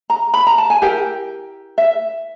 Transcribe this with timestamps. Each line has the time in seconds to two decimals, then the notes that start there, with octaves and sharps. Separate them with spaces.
0.10 A#5
0.34 B5
0.47 A#5
0.58 A5
0.70 G#5
0.82 E4 G4 A#4 G5
1.78 E5